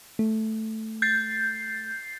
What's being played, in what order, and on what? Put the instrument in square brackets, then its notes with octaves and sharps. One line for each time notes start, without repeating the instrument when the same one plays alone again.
[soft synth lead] A3
[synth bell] G6 A6 C7